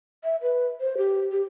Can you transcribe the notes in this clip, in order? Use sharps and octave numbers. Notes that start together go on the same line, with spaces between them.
E5
B4
C5
G4
G4